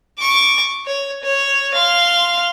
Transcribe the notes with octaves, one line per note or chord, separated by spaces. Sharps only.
C#6 D6
C#5
C#5
F5 C6